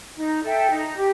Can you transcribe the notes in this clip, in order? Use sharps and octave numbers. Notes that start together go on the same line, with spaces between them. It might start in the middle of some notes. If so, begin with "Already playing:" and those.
D#4
A4 E5 G5
D#4
G4